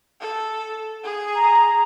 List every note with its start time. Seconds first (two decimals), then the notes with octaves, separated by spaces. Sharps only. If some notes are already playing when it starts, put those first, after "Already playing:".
0.21 A4
1.04 G#4
1.36 A#5